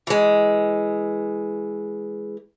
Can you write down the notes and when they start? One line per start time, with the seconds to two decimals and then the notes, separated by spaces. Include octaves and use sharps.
0.07 E3 G#3